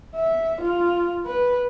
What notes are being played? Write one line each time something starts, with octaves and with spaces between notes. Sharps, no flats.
E5
F4
B4